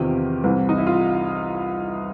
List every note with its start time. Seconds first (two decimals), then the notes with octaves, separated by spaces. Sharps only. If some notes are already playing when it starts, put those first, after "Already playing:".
Already playing: E2 C3 D#3 F4 G4
0.44 C2 C3 E3
0.69 D#4
0.78 E4
0.87 F4